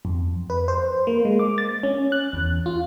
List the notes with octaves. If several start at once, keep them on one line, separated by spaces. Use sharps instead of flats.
F2
B4
C5
A#3
G#3
D6
A6
C#4
F#6
E2
F4